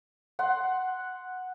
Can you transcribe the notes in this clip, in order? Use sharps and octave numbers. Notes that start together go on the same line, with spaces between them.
F#5 C6